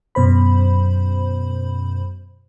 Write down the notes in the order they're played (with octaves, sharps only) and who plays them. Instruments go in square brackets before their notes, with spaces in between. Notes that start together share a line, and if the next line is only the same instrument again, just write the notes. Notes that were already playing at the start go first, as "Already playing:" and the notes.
[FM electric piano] F#2 B2 C5 B5